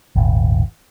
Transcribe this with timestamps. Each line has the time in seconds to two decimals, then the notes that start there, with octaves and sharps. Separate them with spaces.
0.16 D#1 G#1